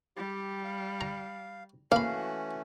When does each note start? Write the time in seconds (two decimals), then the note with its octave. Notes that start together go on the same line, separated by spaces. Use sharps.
0.17 G3 G4
0.64 F5
1.01 A#5
1.92 E3 A3 A#3 C#4 F#4 F5 B5